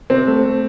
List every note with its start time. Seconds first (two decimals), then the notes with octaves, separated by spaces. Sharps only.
0.10 C3 C4
0.27 A3
0.45 A3